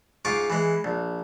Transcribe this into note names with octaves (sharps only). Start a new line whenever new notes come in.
G#2 F4 C#6 D6
E3 G#3
A#1